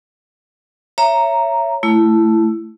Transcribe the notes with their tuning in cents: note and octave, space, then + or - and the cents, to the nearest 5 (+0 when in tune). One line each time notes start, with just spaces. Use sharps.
C#5 +0 E5 +25 A#5 +0
A3 +0 E4 +15